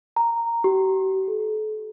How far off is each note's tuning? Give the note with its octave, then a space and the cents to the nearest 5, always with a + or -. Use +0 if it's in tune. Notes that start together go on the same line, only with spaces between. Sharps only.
A#5 -5
G4 -45
A4 -35